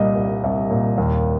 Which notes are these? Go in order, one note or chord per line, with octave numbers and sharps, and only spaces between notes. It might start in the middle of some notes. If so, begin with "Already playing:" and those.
Already playing: C2 A#2 G3 D#5
C2
C2
A#2
D#2